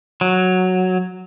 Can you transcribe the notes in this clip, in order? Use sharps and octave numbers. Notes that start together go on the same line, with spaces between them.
F#3